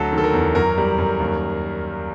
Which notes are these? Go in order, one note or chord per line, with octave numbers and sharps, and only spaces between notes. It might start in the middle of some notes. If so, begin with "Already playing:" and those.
Already playing: D2 F#3 A4
D#3
A4
A#4
E2
F#2 A#4
G3
F#2
D#2